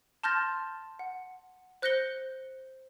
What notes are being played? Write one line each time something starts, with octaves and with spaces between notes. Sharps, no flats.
A5 C6 F6 G6 A6 A#6
F#5
C5 F#6 G6 A#6 C#7 G7